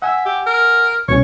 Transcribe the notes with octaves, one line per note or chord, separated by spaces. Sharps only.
E5 F#5 G#5 E6
G4
A#4
C2 B2 C#4 C#5